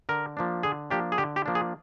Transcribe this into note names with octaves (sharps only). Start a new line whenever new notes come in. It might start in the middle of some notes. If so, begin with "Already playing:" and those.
D3 A#4
F3 A#3 D4
D3 G#4
F3 A#3 D4 G4
G#4
D3 G4
G4
F3 A#3 D4
G#4